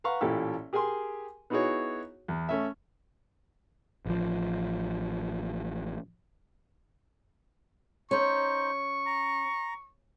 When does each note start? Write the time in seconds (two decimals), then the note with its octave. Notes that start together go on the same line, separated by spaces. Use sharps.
0.04 B4 F5 F#5 A#5 C#6
0.21 A1 A#2 E4 G4 A4
0.73 G4 G#4 A#4 G#5 C6
1.50 B3 D#4 E4 F#4 G#4 C#5
2.28 E2
2.49 A3 C#4 E5
4.06 A1 F3
8.11 C#4 D#4 C5 C#6
9.06 A#5